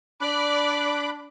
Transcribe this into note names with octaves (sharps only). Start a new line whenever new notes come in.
D4 D5 B5 D6 F#6